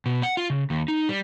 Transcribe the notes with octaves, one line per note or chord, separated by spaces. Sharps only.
B2
F#5
F4
C#3
D#2
D#4
G3